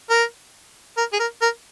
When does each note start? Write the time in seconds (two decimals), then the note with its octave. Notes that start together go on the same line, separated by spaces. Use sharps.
0.10 A#4
0.98 A#4
1.13 G#4
1.20 A#4
1.42 A#4